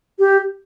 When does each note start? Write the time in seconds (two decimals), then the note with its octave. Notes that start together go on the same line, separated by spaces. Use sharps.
0.19 G4